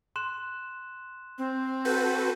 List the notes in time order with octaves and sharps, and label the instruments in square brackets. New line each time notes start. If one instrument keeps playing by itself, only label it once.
[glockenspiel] C6 F#6 E7
[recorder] C4
[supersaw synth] F#4 A4 B4 [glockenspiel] G6